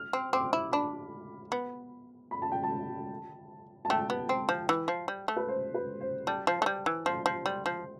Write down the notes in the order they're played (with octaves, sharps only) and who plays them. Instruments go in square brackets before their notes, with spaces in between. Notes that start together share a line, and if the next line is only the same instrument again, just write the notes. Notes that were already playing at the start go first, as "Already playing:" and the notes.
Already playing: [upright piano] F6
[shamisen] C4
[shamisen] C4 [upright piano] D6
[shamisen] E4
[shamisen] D4 [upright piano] B5
[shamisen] B3
[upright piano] B5
A5
G5
A5
A5
[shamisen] A3 [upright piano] G5
[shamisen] B3
C4
F3
E3
F3
G3
A3
[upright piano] B4
C5
B4
C5
[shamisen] G3 [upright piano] A5
[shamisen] F3
A3
G3
E3
[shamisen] F3 [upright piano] C6
[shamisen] F3
G3
F3